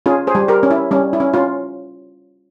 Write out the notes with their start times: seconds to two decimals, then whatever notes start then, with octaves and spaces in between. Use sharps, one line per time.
0.06 C#4 F4 G#4
0.27 G#4 C5
0.35 G3
0.48 G4 A#4
0.63 C#4
0.71 E4
0.91 G3 C#4
1.13 E4
1.20 C#4
1.34 C#4 F4